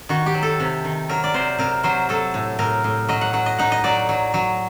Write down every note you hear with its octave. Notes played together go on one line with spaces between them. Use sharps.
D#3 F#4
G4
F#3
A4
C3
D#3
F#3 A#4
D5
C3 C5
C3 A#4
F#3 C5
F#3 A4
A2
A2 A#4
A2
F#3 D#5
F#5
F#3 F#5
D#5
D#4 F#5
D#5
F#3 D5
F#3
F#3